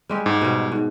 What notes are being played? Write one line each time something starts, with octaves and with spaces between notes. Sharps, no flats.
G3 G#3 G4
G#2
B2 G3
G#2